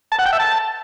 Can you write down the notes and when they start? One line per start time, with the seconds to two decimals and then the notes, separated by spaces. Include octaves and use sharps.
0.12 A5
0.19 F#5
0.26 G5
0.33 E5
0.40 A5